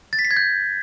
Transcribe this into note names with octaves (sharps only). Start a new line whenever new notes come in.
A6
B6
C7
G#6
G6